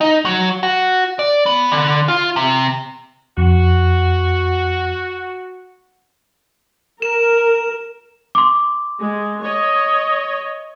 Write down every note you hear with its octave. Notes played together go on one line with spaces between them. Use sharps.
D#4
F#3
F#4
D5
B3
D3
F4
C3
F2 F#4
A#4 E7
C6 D6
G#3
C#5 D#5